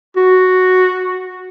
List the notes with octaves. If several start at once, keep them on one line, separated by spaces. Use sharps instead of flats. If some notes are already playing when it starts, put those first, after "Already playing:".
F#4